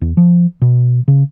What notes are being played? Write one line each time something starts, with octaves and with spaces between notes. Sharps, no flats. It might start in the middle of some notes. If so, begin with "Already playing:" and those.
E2
F3
B2
C#3